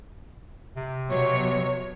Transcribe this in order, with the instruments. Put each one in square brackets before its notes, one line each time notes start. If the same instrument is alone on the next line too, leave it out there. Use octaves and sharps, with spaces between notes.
[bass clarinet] C3
[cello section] B2 F#3 C#5